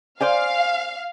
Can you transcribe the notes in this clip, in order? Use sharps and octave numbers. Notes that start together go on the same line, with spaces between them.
C5 D5 F5 G#5